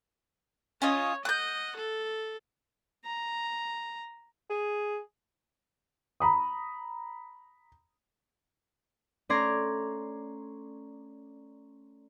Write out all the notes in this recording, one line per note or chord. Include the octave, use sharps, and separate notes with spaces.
C#4 F4 C#5 D#5
D#5 F#5 F#6 G6
A4
A#5
G#4
A#5 B5 D#6
A3 C#4 D5 A#5 C6 G#6